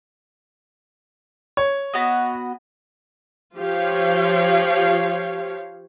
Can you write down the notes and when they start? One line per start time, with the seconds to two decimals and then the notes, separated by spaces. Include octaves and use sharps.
1.57 C#5
1.94 B3 F#4 D#5
3.57 F3 F4 G4 C#5 F5